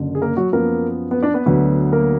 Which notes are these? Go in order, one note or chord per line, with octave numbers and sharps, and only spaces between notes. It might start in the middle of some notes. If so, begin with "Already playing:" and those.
Already playing: F#1 F#2 D3
G#4
A#3 A#4
F#3 F#4
F#2 F3 A#3 B3 A#4
B3 B4
D4 D5
B3 B4
D2 D3 F#3 B3
A#3 A#4